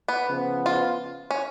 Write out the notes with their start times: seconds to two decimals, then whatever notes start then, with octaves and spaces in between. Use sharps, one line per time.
0.08 B3
0.28 C#3 F3 B3
0.66 F4
1.31 C#4